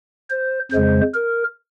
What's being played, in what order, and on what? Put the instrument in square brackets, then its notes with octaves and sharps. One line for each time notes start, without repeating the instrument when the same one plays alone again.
[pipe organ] C5
F2 C#3 G#3 C5
A#4